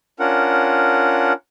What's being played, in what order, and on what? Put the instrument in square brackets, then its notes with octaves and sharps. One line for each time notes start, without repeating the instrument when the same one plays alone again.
[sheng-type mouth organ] C#4 D4 F4 A#4 F#5